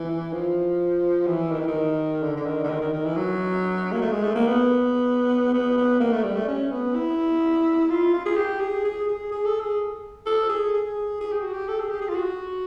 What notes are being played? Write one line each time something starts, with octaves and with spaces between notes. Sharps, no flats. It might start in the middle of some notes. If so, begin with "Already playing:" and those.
Already playing: E3
F3
E3
D#3
E3
D#3
D3
D3
D#3
D3
D#3
D#3
D#3
E3
F#3
A#3
A3
G#3
A3
A#3
B3
B3
B3
A#3
A3
G3
A3
C#4
B3
E4
F4
F4
G#4
G4
G#4
G#4
G#4
G#4
A4
G#4
A4
G#4
G#4
G#4
G4
F#4
G4
A4
G#4
G4
G#4
F4
F#4